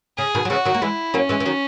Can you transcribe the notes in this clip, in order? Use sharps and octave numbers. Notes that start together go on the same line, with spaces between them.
C#3 G#4
B2 D#3
F#3
C#3 E3 F#4
D#3 F#3
A#3
E3 G#3 E4
F#3 A#3 C#4
E3 G#3
E3
D#3 F#3